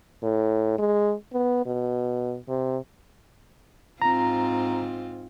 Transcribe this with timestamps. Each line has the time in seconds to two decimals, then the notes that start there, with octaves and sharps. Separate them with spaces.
0.23 A2
0.78 G#3
1.33 B3
1.66 B2
2.48 C3
4.02 G#2 C4 F4 A#5